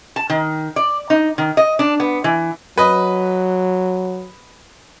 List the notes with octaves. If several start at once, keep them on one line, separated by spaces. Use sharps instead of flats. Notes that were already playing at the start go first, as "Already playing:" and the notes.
A5
D#3
D5
D#4
D#3
D#5
D4
B3
E3
F#3 B4 D#5